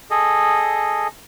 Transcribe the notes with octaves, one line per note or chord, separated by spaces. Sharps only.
G#4 A4 D#5